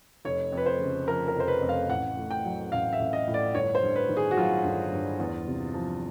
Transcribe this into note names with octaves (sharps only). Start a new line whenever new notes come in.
F1 C#5
F2
B4
C5
C#3
F3 A#4
A#4
F1 C5
B4
F2
F5
A1 F#5
A2
G5
F#3
A1 F5
E5
A1
D#5
A2
D5
G1 C#5
C5
G2
B4
D#3
G#4
F#4
F#3 F4
G1
G2
E2
C3
F3